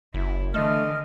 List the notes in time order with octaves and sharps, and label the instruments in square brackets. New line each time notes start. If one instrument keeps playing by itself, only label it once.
[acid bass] F#1 [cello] E4
[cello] D3 E3 [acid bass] A3 [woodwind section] D#5 F6